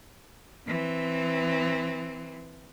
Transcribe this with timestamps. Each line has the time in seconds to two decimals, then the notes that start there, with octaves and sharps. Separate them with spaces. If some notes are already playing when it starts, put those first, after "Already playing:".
0.67 E3 C4